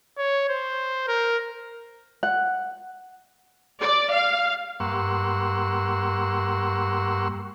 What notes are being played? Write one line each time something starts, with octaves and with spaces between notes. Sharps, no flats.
C#5
C5
A#4
F#5
D5
F5
G2 A#3 F#5 C6 C#6 E6